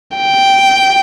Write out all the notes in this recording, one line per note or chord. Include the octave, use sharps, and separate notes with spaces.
G5